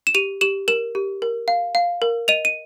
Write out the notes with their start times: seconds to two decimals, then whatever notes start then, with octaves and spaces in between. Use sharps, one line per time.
0.07 E7
0.15 G4 D#7 F7
0.41 G4 E7 F#7
0.68 A#4 E7 F#7
0.95 G4
1.22 A#4
1.48 F5
1.75 F5
2.02 A#4
2.28 D#5 D#7 F7
2.45 D#7